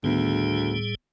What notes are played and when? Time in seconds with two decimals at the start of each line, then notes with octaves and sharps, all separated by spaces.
0.04 D2 A2 D#3 G3 B3 G#4